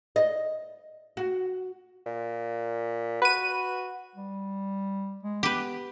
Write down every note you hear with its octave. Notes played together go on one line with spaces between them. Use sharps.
D#5
F#4
A#2
F#4 B4 D#7
G3
G#3
B3 G4 B4